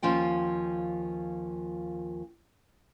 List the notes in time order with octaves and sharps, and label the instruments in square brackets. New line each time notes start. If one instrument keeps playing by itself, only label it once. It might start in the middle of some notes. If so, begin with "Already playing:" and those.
[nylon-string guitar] D#2 F3 C#4 F4 G5